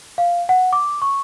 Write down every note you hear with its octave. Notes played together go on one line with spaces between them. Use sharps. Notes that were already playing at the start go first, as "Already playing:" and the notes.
F5
F#5
D6
C#6